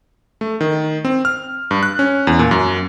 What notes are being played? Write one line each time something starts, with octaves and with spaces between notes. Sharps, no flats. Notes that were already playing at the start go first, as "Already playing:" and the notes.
A3
D#3
C4
F6
G2
F#6
C#4
E2
A#2
F#2